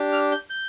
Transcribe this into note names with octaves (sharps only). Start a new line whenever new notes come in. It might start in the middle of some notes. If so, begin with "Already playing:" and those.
Already playing: D4 G4
F6
G6
G6